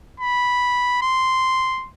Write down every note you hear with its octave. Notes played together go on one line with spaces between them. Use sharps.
B5
C6